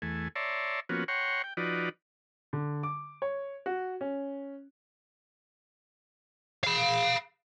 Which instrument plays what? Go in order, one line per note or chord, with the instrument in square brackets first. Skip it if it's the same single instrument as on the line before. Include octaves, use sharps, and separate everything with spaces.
[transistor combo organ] E2 A3 G#5
C#5 D5 E5 A5 A#5 C6
F3 A#3 B3 C#4 F#4
C#5 F#5 G5 A#5 C6 C#6
G5
F3 D#4 F#4 B4 D5
[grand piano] D3
D6
C#5
F#4
C#4
[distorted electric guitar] F5 B5